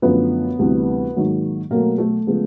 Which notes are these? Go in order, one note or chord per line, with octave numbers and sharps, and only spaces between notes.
F#2 D3 F3 A3 B3 B4
D2 C3 E3 G3
G#2 D#3 F#3 A#3
B2 F#3 A3 A#3 A#4
A3 A4
C#3 F3 G#3 B3